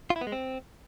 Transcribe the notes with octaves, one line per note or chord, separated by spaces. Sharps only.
F4
E4
B3
G#3
C4